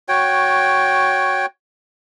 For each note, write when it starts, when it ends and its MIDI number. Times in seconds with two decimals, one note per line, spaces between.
0.09 1.46 66
0.09 1.46 73
0.09 1.46 79